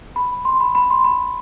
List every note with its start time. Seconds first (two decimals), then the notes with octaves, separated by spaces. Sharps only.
0.16 B5
0.45 C6
0.60 B5
0.75 B5
0.90 C6
1.04 B5